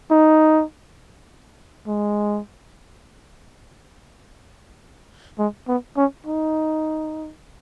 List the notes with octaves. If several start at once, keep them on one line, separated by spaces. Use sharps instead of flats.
D#4
G#3
G#3
B3
C#4
D#4